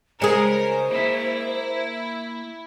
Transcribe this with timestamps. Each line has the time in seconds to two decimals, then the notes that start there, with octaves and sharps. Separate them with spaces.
0.22 C#3 G#3 G#4 A#4 C5
0.91 A#3 E4 E5